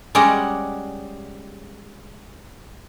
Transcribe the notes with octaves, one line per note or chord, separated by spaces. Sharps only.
G3 G#3 C#4 D5 D#5 F#5